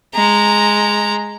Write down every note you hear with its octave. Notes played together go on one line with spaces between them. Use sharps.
G#3 A#5